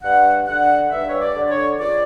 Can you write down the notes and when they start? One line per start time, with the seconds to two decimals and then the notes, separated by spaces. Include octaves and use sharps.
0.03 G2 F#5
0.47 D3 F#5
0.90 G2 E5
1.09 C#5
1.20 D5
1.35 D3
1.49 C#5
1.79 C#2 D5